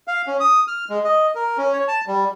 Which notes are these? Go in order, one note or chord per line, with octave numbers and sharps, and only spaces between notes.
F5
C#4
D#6
F6
G#3
D#5
A#4
C#4
C#5
A5
G3